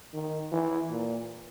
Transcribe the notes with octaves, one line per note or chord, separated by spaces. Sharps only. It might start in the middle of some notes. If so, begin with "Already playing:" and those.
D#3
E3
A#2